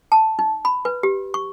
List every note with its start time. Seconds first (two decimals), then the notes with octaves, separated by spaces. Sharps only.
0.12 A5
0.39 D#4
0.65 B5
0.85 B4
1.03 G4
1.34 C#6